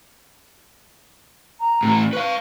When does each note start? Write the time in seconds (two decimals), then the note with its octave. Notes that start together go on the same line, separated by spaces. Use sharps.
1.60 A#5
1.83 A2 E3
2.13 B4 F5 C#6